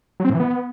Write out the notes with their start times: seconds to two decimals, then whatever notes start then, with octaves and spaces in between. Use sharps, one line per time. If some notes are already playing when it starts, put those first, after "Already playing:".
0.20 F#3
0.25 C4
0.30 A2
0.35 E3
0.40 B3